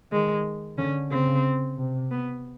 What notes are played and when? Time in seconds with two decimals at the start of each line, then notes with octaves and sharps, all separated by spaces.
0.12 D#3 G#3
0.77 D3 C#4
1.10 C#3 C4
1.77 C3
2.11 B3